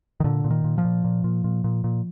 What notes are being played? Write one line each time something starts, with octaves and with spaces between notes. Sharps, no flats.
D#3
A#2 D3
A#2
D#3
A#2
F3
A#2
A#2
A#2
A#2
A#2
A#2